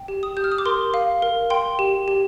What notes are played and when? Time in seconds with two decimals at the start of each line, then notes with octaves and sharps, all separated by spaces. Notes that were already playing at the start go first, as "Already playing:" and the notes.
Already playing: G5
0.08 G4
0.23 D#6
0.37 G4 G6
0.44 F6
0.52 D#6
0.58 D6
0.65 A#4 C6
0.94 F5
1.22 A#4
1.50 G5 C6
1.79 G4
2.08 G4